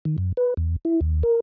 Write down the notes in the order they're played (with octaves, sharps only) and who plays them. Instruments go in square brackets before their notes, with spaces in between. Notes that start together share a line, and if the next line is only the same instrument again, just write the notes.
[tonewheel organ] D#3
F#2
B4
E2
E4
D#2
A#4